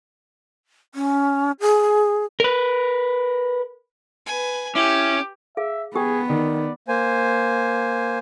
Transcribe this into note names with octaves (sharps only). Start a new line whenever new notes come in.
C#4
G#4
A#4 B4
B4 G#5
C#4 E4 G4 D6
G#4 E5 F5
B3 G4 G#4 G5
D#3 D5
A#3 C5 G#5